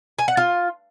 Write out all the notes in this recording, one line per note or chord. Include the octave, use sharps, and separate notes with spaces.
G#5
F#5
F4